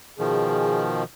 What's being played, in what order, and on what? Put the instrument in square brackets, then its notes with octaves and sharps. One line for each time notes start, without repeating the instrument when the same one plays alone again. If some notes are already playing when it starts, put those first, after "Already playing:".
[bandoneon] B2 D#3 F3 [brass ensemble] G#4